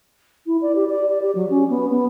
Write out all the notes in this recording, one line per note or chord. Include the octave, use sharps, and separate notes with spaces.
E4
D5
G4
D5
D5
G4
F#3
C#4
B3
B3